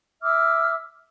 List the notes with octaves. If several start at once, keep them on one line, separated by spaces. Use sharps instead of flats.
E5 D6 E6 F6